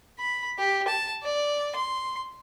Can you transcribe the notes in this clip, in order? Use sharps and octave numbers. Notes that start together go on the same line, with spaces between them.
B5
G4
A5
D5
C6